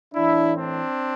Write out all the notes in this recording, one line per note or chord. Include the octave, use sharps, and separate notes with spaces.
A2 E3 D4 E4
C4 D4